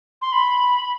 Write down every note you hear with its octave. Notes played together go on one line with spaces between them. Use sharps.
C6
B5